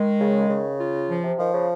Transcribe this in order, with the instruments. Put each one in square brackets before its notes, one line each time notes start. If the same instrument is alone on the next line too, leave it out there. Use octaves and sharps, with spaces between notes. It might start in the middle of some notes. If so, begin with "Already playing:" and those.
Already playing: [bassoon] D#3 [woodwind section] G#3
[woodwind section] C#3
C#3
F4
F3
[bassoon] C3
[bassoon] D#3 [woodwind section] F3
[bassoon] C#3